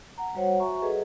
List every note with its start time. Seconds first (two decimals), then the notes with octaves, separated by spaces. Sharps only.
0.18 F#5 A#5
0.35 G3 F#4 C5 C#5 F#5
0.60 F#4 E5 G#5 A#5 C#6
0.82 G#4 A4 B4 D#5